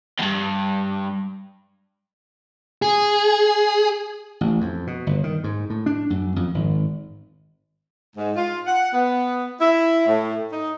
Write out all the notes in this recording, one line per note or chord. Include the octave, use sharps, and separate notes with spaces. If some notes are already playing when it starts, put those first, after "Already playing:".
E2 G2
G#4
A1
F2
B2
G1
D#3
G#2
A2
D4
F#2
F2
G#1
G#2
F4
F#5
B3
E4
A2
D#4